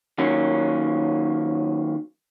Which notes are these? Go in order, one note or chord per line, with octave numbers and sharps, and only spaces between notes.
D#3 F#3 A#3 C#4